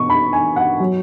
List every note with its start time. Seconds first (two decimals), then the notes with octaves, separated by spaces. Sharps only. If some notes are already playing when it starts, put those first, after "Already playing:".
Already playing: B2 C#6
0.10 B5
0.33 G#5
0.56 F#5
0.80 F#3